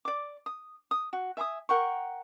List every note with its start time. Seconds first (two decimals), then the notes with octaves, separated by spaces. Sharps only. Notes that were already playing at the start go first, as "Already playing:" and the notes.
0.05 D5 D6
0.46 D#6
0.91 D#6
1.13 F#4
1.37 E5 G#5 B5 D#6
1.69 A#4 F#5 G5 C#6